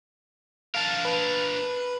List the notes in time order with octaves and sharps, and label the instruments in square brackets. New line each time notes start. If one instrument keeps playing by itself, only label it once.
[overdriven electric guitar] D4 A#4 [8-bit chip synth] F5 A5
[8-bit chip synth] B4